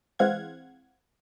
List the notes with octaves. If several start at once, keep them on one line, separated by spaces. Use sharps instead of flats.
E3 G#3 C4 F5 F#5 G#6